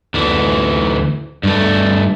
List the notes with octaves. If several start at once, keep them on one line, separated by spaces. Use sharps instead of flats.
D2 E3
G2 A3